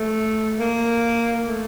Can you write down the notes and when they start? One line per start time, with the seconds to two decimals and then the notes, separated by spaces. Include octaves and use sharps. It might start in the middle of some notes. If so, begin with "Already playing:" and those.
Already playing: A3
0.59 A#3
1.47 A3